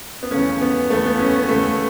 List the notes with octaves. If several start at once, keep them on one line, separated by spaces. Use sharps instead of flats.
B3
E2 C#3 A3 C#4
B3
E2 C#3 A3
B3
C#4
B3
E2 C#3 A3